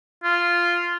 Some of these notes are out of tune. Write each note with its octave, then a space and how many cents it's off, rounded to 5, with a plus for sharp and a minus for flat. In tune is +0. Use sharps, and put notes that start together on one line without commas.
F4 -5